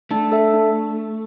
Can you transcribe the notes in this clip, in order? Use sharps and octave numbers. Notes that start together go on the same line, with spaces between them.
A3 D4
A4 E5
D4